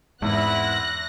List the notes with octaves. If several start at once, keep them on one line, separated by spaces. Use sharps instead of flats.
E2 G#2 B3 C4 E4 F#6 A#6